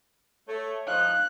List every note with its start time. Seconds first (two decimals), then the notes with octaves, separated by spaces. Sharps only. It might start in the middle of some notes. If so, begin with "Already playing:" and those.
0.48 A3 C#5
0.87 F3 D#4 F5 F#6